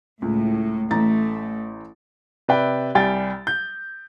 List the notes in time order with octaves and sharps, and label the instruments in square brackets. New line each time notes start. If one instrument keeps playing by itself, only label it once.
[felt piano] C#2 [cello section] A2
[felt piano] A1 A#5 A6 [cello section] A3
[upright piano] C3 B4 D5 E5 G5
C2 G3 G5 G#5 A6
G6